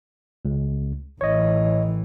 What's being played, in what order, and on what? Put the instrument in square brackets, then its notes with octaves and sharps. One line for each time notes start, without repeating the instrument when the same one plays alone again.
[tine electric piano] C#2
[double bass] A1 E3 [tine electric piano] C#5 D#5